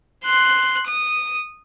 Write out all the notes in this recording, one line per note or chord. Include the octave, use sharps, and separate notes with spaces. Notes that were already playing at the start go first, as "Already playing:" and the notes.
C6 F#6
D#6